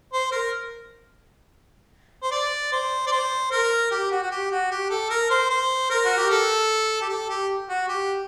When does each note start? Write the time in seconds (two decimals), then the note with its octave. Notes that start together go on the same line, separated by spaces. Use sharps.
0.14 C5
0.32 A#4
2.23 C5
2.32 D5
2.72 C5
3.07 D5
3.12 C5
3.52 A#4
3.91 G4
4.12 F#4
4.22 F#4
4.31 G4
4.51 F#4
4.71 G4
4.90 A4
5.10 A#4
5.30 C5
5.50 C5
5.90 A#4
6.05 F#4
6.17 G4
6.30 A4
7.02 G4
7.09 A4
7.30 G4
7.69 F#4
7.88 G4